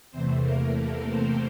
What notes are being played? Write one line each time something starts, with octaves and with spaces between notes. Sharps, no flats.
E2 C3 E3 A3 C4 C5
A#3 A#4
A3 A4
C4 C5